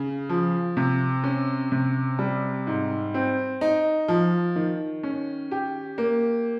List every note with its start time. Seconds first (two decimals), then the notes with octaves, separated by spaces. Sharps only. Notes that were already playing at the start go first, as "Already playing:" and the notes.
Already playing: C#3
0.29 F3
0.77 C3
1.24 C#4
1.72 C3
2.19 G3
2.67 G#2
3.14 C4
3.61 D#4
4.08 F3
4.56 D#3
5.03 C#4
5.51 G4
5.98 A#3